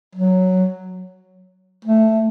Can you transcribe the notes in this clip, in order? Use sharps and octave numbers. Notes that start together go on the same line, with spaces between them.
F#3
A3